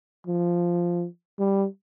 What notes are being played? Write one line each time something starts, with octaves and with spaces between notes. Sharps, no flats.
F3
G3